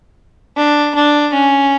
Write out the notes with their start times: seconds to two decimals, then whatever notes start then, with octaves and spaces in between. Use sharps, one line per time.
0.57 D4
0.95 D4
1.33 C#4